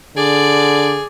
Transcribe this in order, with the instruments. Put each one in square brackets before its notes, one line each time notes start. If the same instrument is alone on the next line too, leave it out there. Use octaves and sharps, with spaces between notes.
[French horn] D3 [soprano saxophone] G#4 [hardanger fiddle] D5